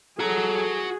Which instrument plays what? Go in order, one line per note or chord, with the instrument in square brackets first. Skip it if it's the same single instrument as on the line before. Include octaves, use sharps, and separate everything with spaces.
[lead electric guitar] F#4 A#5 [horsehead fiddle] G#4 [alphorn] A4